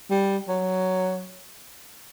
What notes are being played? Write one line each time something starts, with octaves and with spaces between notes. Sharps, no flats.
G3
F#3